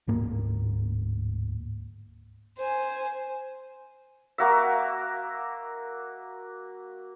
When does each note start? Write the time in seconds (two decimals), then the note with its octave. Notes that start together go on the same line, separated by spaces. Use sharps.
0.07 D1 G#2 A#3
2.58 C5 G#5
4.38 A#3 F#4 E5